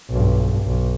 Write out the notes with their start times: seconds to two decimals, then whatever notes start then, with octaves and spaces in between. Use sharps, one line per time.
0.11 B1 G2
0.66 B1